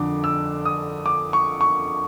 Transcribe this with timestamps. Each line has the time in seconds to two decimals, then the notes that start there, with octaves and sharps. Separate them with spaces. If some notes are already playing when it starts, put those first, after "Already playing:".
Already playing: F2 D3 D6
0.24 E6
0.65 D#6
1.06 D6
1.33 C#6
1.61 C#6